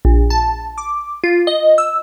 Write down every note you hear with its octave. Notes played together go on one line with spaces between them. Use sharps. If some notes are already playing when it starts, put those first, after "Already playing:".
A#1
A5
D6
F4
D#5
E6